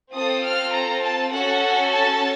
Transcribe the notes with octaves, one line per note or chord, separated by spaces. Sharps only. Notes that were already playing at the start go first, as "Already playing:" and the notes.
C4 F4 A4 D#6
F6
A#5
A5
C#4 F#4 A4 F#5
A5